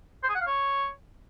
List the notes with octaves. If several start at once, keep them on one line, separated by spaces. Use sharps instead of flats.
C5
G#4
F#5
F5
C#5